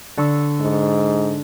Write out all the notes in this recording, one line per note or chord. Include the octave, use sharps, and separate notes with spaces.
D3 C#6 E6
G#2